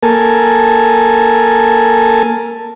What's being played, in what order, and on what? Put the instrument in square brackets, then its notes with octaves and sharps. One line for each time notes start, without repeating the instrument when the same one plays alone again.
[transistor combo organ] A#3 A4 A#4 G#5 A5